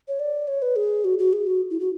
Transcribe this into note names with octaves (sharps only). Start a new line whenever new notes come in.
C#5
D5
C#5
B4
G#4
F#4
F#4
G#4
F#4
E4
F#4